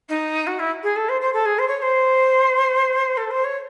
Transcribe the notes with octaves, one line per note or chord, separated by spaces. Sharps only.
D#4
F#4
E4
G#4
A4
C5
C5
A4
G#4
C5
C#5
C#5
C5
A4
C5
C#5